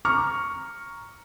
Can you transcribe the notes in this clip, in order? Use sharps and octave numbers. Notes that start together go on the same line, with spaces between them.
A#5 C#6 F6